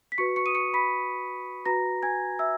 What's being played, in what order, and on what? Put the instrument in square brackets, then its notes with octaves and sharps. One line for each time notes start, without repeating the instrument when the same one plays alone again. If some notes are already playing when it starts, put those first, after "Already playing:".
[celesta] B6
F#4 B4 C#6 C#7
C#6 C#7
D#6 D#7
C#6 C#7
B5 B6
F#4 B4 A#5 A#6
G#5 G#6
E5 E6